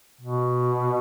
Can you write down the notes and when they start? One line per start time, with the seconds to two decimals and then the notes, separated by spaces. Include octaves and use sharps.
0.21 B2